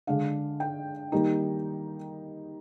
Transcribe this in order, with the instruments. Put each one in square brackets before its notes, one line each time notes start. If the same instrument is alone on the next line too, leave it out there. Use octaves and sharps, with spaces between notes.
[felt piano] D3 G#3 D4 F5
G5
D#3 G3 A#3 D#4